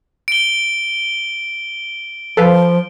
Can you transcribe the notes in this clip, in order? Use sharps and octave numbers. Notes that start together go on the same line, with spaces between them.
D7 G7
F3 A4 B4 F5